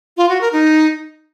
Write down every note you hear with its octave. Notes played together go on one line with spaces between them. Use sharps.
F4
F#4
A#4
D#4